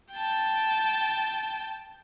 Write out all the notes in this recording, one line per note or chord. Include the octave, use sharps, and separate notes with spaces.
G5 A5